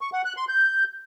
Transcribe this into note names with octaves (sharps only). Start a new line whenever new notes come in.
C#6
F#5
F#6
C6
G6